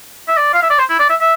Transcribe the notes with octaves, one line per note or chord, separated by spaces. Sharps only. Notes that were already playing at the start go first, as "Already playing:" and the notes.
E5
D5
F5
E5
D5
C5
E4
D5
E5
E5